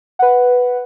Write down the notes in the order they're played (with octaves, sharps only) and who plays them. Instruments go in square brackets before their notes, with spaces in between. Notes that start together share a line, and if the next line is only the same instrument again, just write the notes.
[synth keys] B4 F#5